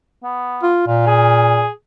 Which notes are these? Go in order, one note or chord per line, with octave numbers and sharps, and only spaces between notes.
B3
F4
A#2 F4
G#4